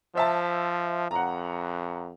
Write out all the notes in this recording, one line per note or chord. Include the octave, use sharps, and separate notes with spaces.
F3 C5 E5 A5
F2 F#5 A#5